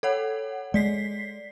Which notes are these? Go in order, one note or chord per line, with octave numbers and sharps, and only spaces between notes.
A4 C#5 F#5
G#3 D5 B6 C7